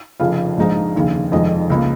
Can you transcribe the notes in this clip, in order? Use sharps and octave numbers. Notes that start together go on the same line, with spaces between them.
F1 F2 C#3 F3 F5
A#1 G#2 G#3 D#4
F1 D#2 C#3
F1 F2 D#3 G#3 D#5
C#2 C#3 A#3